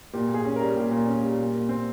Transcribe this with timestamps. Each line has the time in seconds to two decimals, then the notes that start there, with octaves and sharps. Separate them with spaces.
0.14 A#2 G4
0.29 A#2
0.34 G#4
0.45 C#4
0.56 A#4
0.61 G3
0.76 A#2 G4
0.91 A#2
1.07 C#4
1.23 G3
1.38 A#2
1.55 A#2
1.69 C4